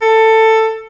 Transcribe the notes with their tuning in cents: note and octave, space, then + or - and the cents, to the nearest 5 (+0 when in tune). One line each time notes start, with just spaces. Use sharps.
A4 +15